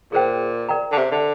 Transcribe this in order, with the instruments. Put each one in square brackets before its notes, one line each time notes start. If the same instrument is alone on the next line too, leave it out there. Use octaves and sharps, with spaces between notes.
[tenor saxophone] A#2 [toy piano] G#4 C5 G5
[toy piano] A#4 D5 G5 A#5
[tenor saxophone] D3
C3
D3